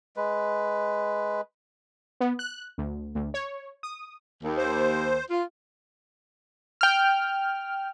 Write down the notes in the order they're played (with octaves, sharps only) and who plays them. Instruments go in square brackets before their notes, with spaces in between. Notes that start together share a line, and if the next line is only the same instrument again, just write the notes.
[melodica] G#3 B4
[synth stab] B3
F#6
D2
D2
C#5
D#6
[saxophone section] D#2
[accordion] C5
[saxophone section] F4
[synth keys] G5 F6